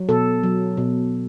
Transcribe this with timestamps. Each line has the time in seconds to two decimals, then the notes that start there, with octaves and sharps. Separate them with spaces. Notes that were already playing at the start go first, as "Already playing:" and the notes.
Already playing: F#3
0.09 B2 A4
0.43 F#3
0.77 B2